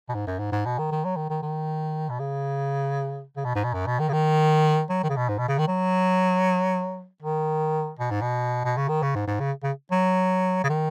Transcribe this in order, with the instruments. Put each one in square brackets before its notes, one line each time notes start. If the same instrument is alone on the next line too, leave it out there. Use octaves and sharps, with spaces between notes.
[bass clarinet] B2
G#2
F#2
G#2
G#2
B2
D#3
D#3
F#3
D#3
D#3
D#3
B2
C#3
C#3
B2
G#2
B2
F#2
B2
D#3
C#3
D#3
F#3
D#3
C#3
B2
G#2
B2
C#3
D#3
F#3
D#3
B2
G#2
B2
B2
C#3
D#3
C#3
G#2
G#2
C#3
C#3
F#3
C#3
D#3